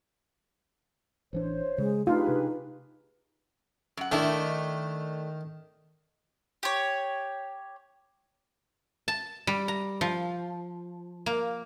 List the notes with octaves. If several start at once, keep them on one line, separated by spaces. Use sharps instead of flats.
A1 E3 D4 C5 C#5
C#3 G#3
A3 B3 D4 D#4 F4 G4 G#4 B4
C3 D4
F#2 F#5
D#3 A3 D4 E4
G4 C#5
A5
G3
A#5
F3
A#3